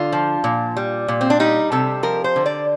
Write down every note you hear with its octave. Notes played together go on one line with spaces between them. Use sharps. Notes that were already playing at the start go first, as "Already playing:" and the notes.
Already playing: D3 F4
F3
A#2
G3
A#2
C4
D4
G3 D#4
C3 A4
F3 A#4
C5
D3
D5